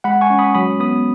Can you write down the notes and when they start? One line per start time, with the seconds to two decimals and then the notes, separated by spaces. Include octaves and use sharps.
0.04 G#3 F#5 B5
0.21 G#5 C#6
0.30 C#4
0.39 B5 D#6
0.55 F#3 B5 D#6
0.80 B3 B5 D#6